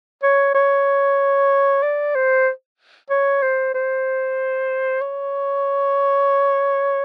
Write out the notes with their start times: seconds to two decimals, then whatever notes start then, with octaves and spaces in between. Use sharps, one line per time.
0.23 C#5
0.55 C#5
1.83 D5
2.15 C5
3.10 C#5
3.42 C5
3.74 C5
5.01 C#5